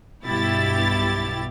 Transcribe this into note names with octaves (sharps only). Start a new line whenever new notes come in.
B1 G2 B2 E4 G4 A6